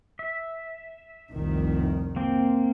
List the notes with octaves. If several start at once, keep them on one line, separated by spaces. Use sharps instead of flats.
E5
F1 C2 D#3
A#3 C4